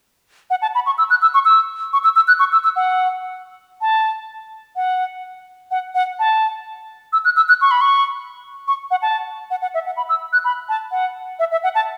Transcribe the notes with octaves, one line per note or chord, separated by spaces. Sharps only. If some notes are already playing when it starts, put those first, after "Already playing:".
F#5
A5
B5
C#6
E6
F#6
E6
C#6
E6
C#6
E6
E6
F#6
C#6
E6
E6
F#5
A5
F#5
F#5
F#5
A5
E6
F#6
E6
F#6
C#6
B5
C#6
C#6
F#5
A5
F#5
F#5
E5
F#5
B5
E6
F#6
B5
A5
F#5
E5
E5
F#5
A5